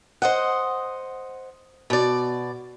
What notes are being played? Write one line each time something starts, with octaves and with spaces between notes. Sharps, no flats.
C5 D#5 F#5
B2 D5